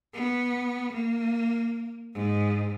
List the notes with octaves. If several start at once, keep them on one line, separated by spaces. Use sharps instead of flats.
B3
A#3
G#2